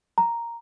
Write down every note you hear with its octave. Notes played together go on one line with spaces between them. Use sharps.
A#5